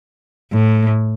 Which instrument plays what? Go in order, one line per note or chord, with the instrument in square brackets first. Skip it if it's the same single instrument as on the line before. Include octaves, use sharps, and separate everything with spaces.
[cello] A2